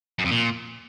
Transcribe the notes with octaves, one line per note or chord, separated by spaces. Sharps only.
F#2
F2
A#2